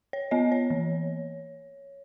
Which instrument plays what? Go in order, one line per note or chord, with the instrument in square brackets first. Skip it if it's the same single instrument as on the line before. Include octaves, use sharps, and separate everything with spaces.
[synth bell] C#5
B3 D#5
C#5
E3